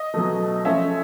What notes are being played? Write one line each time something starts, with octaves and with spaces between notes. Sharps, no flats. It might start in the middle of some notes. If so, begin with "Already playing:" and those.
Already playing: D#5
B2 F#3 A3
F3 A3 C#4 E5